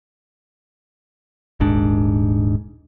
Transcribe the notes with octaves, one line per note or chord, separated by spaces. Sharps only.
D#1 G#1 G#2 D4